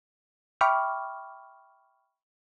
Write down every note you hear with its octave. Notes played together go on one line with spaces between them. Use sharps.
E5 G5 B5 C#6 D6 F6